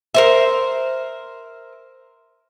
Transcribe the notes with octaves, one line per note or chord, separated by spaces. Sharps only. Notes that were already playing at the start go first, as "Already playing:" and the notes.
A#4 C5 E5